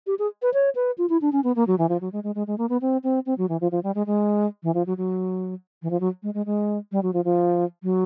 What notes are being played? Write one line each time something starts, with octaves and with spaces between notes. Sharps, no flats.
G4
G#4
B4
C#5
B4
F4
E4
D4
C#4
B3
A#3
F#3
E3
F3
F#3
G#3
G#3
G#3
G#3
A#3
B3
C4
C4
C4
F#3
E3
F3
F3
G3
G#3
G#3
E3
F3
F#3
F#3
E3
F3
F#3
G#3
G#3
G#3
G3
F#3
F3
F3
F#3